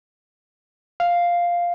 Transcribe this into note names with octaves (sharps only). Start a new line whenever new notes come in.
F5